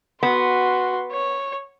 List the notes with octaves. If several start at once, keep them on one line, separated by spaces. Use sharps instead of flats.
B3 F#4 C6
C#5